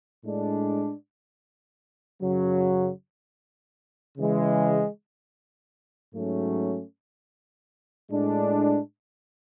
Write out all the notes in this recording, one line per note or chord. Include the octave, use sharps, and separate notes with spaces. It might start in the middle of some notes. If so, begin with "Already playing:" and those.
A2 G#3 D4
F#2 C#3 F#3
C#3 E3 G#3
G#2 F#3 A3 C#4
A2 G#3 D4